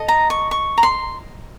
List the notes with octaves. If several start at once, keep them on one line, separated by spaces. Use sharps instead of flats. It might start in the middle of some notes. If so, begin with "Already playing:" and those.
Already playing: A4 D#5
A#5
C#6
C#6
A#5
C6